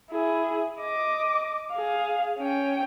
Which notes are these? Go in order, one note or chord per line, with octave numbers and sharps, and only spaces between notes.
E4 G#4
D#5 D6
G#4 F5
C#4 G5